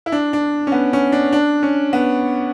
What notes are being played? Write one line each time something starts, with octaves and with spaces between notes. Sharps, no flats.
E4
D4
D4
C#4
B3
C#4
D4
D4
C#4
B3